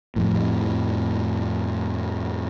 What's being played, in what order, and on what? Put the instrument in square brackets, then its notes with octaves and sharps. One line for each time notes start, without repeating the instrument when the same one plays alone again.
[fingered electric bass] F2 A2